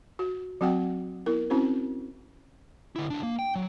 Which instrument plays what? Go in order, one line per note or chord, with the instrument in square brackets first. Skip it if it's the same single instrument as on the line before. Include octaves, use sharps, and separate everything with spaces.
[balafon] F#4
F#3 C4 F#4 F#5 G5
B3 E4 A#4
C4 C#4 E4 F#4 C5
[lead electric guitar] D3 E4
C#2 D4
A#3
G5
F#3